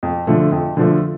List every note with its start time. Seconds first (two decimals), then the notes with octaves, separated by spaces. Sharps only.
0.03 F2
0.27 D3 F3 A3
0.52 F2
0.77 D3 F3 A3